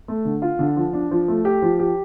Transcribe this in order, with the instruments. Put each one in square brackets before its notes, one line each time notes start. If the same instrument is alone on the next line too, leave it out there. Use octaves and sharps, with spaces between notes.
[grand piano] A3
D3
F4
D3
F3
D4
F3
A3
G4
F3
G4